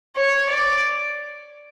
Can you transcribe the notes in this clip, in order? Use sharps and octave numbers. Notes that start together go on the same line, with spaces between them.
C#5
D5